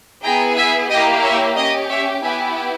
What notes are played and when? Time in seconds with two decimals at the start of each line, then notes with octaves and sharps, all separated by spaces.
0.23 B3 E4 G#4 G5 A#5
0.57 E5 G#5
0.90 A#3 E4 G4 D#5 G5
1.23 C#5 E5
1.56 C#4 G4 D#5
1.89 C#5 E5
2.23 B3 E4 G4 E5 G#5